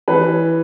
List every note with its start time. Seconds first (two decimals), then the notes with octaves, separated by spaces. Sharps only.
0.08 E3 B4